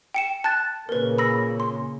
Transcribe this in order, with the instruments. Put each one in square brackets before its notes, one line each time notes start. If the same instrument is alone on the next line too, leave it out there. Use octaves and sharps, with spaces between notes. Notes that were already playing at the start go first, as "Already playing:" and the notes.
[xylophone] G5 C#7 E7
A5 F#6 A6
[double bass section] A#2 C#3 A#3 [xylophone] A#4 B4
[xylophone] B5 E6 A#6
C6